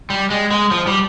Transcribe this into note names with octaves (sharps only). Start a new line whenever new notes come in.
G3
G#3
G#3
F3
G3